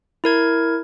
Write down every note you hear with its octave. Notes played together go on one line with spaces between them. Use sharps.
E4 A#4 G#6